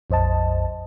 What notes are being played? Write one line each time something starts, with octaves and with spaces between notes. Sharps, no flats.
A#1 F2 C5 D#5 A5